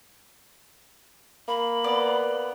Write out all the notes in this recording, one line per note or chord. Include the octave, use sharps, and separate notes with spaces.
A#3 B5
B3 D5